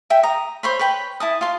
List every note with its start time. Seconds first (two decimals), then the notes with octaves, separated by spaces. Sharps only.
0.10 E5 G5
0.23 A#5 D#6
0.63 C5 C#5 B5
0.79 B4 C#5 G5 B5
1.20 E4 A5 D#6
1.41 F4 C6